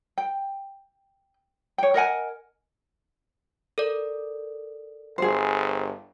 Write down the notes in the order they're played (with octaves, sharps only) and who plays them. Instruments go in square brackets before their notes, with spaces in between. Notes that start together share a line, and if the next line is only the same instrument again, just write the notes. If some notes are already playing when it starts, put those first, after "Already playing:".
[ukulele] G5
C#5 G5
A#4 D#5 F#5 G#5
[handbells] A4 A#4 D5
[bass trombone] G1 [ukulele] G#4 C5